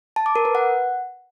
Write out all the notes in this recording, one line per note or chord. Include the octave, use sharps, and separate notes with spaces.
A5
D6
A#4
B4
F#5